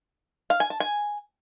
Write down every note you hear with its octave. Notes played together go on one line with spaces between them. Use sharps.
F5
G#5
A5
G#5